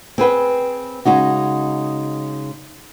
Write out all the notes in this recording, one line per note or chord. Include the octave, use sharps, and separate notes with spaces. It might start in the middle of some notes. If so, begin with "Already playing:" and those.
C4 G#4 B4 G5
C#3 G#3 D#4 F#4